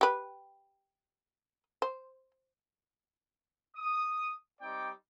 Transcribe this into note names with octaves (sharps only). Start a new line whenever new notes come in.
G4 B4
C5
D#6
G3 C4 D#4 D5 G5 D6